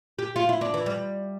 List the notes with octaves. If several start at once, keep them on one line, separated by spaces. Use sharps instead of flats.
G4
F4
E4
D4
E3
G3